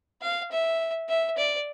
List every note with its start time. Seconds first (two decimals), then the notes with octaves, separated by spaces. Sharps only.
0.22 F5
0.51 E5
1.09 E5
1.37 D5